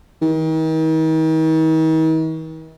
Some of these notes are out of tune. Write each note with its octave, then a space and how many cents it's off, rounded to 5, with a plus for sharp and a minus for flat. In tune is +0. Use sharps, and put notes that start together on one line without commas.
D#3 +40